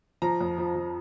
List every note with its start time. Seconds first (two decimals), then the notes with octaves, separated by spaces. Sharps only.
0.22 F3 A#5
0.41 F2
0.58 F3
0.75 F3